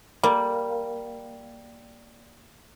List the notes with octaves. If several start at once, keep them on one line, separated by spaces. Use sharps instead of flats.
G3 A#3